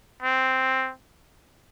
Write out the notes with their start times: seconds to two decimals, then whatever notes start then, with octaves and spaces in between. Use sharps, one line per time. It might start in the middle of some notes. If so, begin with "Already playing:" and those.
0.22 C4